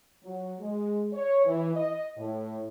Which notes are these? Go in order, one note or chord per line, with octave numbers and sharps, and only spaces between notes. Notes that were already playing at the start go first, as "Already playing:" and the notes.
F#3
G#3
C#5
E3
D#5
A2